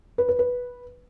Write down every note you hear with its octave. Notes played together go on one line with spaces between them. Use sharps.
B4
B4
B4